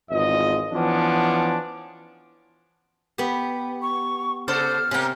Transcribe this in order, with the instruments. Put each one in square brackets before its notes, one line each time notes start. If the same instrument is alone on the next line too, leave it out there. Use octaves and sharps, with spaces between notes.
[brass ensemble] G#1 E2 F4 D#5
E3 F3 B3 C#4 D4
[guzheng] B3 G4
[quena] C#6
[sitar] C#3 A4 C5 [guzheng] D5 [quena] F6
[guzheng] C3 G5 [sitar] A#3 C#4